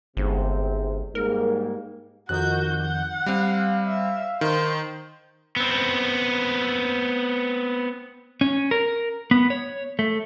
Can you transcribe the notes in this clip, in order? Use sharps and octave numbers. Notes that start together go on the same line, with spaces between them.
G1 G#2 C3 C4
G#2 G3 A#3 A#4
F2 D#3 F#4 F#6 G6
F#5
G3 C4 F5
E5
D#3 C5
B3 C4
C#4
A#4
B3
C#5
A3